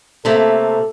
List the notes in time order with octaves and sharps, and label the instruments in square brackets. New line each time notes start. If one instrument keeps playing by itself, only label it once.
[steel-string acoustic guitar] C3 A3 A#3 [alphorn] A4